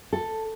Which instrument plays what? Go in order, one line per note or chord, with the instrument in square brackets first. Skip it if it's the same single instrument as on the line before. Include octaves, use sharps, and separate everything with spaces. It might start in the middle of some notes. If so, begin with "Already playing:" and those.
[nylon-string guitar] A4